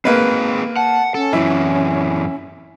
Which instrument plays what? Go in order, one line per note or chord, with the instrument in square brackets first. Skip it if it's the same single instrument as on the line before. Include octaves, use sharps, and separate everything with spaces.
[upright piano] A#3 B4 [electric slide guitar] C4 G#4 A#4
[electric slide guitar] F#5 [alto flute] A5
[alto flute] C#4 [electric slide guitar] A4
[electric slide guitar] F#2 E3 [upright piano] E4